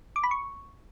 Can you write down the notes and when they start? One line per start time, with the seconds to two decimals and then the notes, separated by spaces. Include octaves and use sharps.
0.16 D6
0.24 B5
0.31 C#6